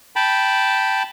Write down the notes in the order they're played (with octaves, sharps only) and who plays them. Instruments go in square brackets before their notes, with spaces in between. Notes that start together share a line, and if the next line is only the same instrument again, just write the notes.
[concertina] G5 A5 B5